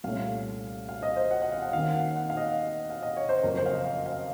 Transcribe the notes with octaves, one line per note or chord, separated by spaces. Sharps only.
C2 A#2 A3 C#4 F5
F5
D#5
C5
F#5
F#5
F5
F#5
D#2 D#3 A#3 C#4 F5
F#5
F#5
F5
D#5
F5
D#5
C#5
C5
F#1 F2 C#3 A#4
C5
F5
D#5
F5
F5